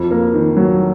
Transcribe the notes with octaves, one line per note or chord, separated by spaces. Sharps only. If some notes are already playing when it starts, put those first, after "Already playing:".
Already playing: F2
A#3
D#3
F#3